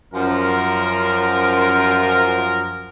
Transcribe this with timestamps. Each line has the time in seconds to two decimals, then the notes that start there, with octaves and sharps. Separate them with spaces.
0.14 F#2 F3 A#4